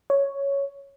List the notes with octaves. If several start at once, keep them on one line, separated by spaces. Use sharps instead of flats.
C#5